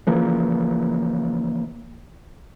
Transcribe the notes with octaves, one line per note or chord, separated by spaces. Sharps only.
C#3 E3 F3 A#3